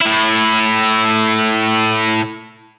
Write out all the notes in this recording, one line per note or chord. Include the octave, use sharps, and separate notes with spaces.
A2 E4